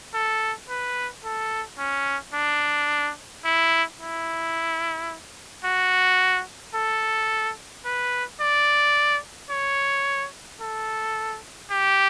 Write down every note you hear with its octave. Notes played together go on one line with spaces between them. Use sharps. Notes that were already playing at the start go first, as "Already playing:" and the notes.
A4
B4
A4
C#4
D4
E4
E4
F#4
A4
B4
D5
C#5
A4
G4